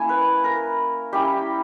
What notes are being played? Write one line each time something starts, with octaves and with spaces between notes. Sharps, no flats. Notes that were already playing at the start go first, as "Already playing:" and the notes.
Already playing: A#3 C#4 E4 G#5
B4
A#4
G3 C#4 E4 G4